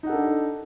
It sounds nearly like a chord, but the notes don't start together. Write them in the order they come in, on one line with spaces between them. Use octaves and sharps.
D#4 F#5 A4 D4